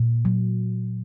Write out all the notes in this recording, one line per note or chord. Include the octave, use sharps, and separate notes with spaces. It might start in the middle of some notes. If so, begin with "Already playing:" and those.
Already playing: A#2
F#3